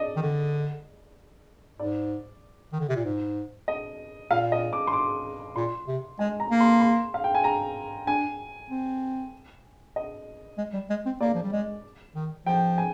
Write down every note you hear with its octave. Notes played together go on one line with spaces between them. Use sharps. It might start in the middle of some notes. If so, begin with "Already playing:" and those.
Already playing: D5 D#5
D#3
D3
G#2 D5
D#3
D3
C3
A#2
G#2
D#5
A#2 F5
D#5
D6
C6
D6
A#2 C6
C3
G#3 G#5
A#5
A#3
C6
C6
F5
G5
G#5
A#5
D4 G#5
C4
D#5
G#3
G3
G#3
C4
A#3 D5
F3
G3
G#3
D#3
F3 G5
G#5